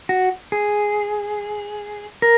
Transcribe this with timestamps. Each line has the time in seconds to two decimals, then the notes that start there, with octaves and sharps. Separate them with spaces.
0.09 F#4
0.52 G#4
2.22 A#4